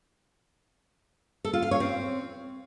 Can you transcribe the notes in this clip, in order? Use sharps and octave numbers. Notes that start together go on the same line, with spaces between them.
A4
F4
F5
C#5
C4